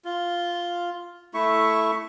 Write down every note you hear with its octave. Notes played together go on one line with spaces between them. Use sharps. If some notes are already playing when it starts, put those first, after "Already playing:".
F4
A3 E4 E5 C#6